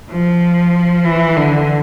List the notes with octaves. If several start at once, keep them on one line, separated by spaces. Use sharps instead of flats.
F3
E3
D3